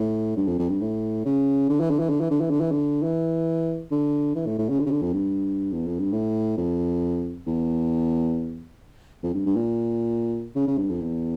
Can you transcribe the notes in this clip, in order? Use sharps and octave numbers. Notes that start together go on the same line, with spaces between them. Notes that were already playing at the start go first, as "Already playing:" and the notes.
Already playing: A2
G2
F2
F2
G2
A2
C#3
D3
E3
D3
E3
D3
E3
D3
E3
D3
E3
D3
E3
D3
E3
A2
A2
C#3
D3
C#3
D3
F2
G2
E2
F2
G2
A2
F2
E2
F2
G2
G2
A#2
C#3
C#3
G2
F2
E2